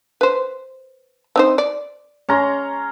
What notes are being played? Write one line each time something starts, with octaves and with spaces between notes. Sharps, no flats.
B4 C5
C4 D#4 C5
D5
C#4 A#5 C6